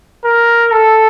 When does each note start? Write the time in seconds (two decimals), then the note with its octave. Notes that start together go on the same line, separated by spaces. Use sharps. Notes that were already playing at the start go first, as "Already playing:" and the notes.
0.24 A#4
0.72 A4